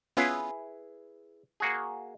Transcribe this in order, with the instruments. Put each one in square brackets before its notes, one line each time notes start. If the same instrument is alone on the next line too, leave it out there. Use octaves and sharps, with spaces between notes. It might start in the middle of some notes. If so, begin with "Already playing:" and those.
[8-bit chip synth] B3 C#4 F4 [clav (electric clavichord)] E4 G#4 B4
[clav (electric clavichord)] A#3 F#4 G#4